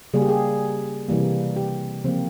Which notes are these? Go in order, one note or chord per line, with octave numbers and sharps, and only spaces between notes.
C#3 G3 A#3 G#4
G4
G#4
C3 E3 G3 A#3
G4
C#3 F3 A#3 C4